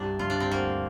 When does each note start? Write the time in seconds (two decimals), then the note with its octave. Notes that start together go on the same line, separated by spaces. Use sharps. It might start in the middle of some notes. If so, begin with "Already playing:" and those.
Already playing: C2 G2 D4 G4
0.19 G2 F4
0.30 D4
0.40 C4
0.51 D2 A#3